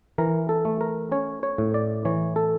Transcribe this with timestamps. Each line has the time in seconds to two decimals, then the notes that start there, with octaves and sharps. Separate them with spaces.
0.18 E3 A#4
0.49 A4
0.65 A3
0.81 A#4
1.11 C#4 C#5
1.43 C#5
1.58 A2
1.74 D5
2.05 E3 C#5
2.36 A4